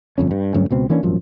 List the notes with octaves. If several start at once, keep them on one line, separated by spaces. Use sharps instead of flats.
G1 F2 C#4
G2
D2 G2 F#3 C#4
C#2 B2 C4
E3 A#3 C#4 D4
D#1 G#1 F#2 F3